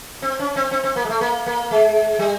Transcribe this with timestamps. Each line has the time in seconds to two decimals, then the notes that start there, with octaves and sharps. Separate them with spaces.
0.22 C4
0.39 C#4
0.56 C4
0.71 C4
0.84 C4
0.96 A#3
1.05 G#3
1.09 A3
1.21 A#3
1.46 A#3
1.71 G#3
2.19 G3